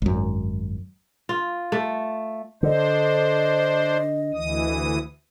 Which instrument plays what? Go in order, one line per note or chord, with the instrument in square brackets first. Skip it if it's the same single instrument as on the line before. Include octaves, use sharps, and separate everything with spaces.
[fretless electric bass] G#1 F#2
[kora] F4
A3
[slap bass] D3 [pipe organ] D4 C5 [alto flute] D#5
[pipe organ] D2 E3 D#6